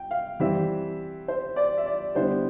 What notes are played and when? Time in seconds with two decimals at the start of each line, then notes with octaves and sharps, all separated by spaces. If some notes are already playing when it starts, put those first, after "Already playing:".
Already playing: G5
0.11 F5
0.40 E3 G3 C4 E4 E5
1.28 C5
1.56 D5
1.77 E5
1.86 D5
2.15 D3 G3 B3 E4 C5